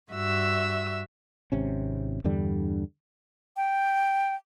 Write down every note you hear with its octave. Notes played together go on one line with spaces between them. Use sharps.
G2 F#4 E5 E6
G#1 C3 C#4
E2 G2 D3 G3
G5